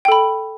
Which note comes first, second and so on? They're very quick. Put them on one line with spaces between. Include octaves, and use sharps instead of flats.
G5 A4 B5